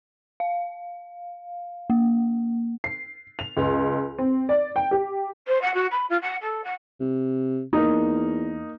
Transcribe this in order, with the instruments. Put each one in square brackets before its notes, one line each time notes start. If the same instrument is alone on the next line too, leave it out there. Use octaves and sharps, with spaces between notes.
[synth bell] F5
A#3
[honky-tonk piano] C7
F7
C#2
C4
D5
G5
G4
[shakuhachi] C5
F#5
F#4
B5
F4
F#5
A4
F#5
[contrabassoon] C3
[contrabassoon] E2 [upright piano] A#3 D#4